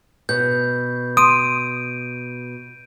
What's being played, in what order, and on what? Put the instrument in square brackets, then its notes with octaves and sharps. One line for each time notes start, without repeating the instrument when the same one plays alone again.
[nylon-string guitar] B2 [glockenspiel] G6
[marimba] C6 [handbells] D#6 [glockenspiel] D7 D#7